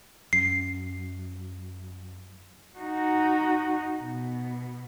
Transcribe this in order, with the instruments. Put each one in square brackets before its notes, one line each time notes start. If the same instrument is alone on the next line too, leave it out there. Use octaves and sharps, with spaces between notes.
[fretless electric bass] F#2 [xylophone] C7
[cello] D#4 F#4
B2